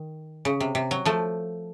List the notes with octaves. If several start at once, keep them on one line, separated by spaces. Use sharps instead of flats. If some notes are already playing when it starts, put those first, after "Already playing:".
Already playing: D#3
C#3
C3
C3
F#3
F3 A3